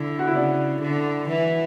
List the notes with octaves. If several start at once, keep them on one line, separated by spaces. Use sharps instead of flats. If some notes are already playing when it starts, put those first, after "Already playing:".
Already playing: D3 E4
F#4
E4
C#3 D4
D3
E3